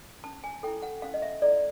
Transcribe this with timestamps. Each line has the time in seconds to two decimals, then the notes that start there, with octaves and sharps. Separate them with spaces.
0.24 C#4 A5
0.44 G#5
0.63 E4 A4 G5
0.83 F#5
1.02 C#4 F5
1.14 D#5
1.22 E5
1.42 E4 A4 D5